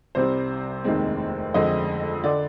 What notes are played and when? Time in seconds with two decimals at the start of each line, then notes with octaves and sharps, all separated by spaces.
0.15 C2 C3 G3 C4 C5
0.84 F1 D#2 D#3 G#3 C4
1.54 F2 D3 G#3 C4 D#5
2.24 D3 D5